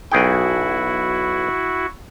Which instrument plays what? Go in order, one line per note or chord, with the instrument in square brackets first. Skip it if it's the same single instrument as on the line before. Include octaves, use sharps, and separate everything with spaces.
[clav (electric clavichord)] B1 G#4 G5 [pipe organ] E4 F#4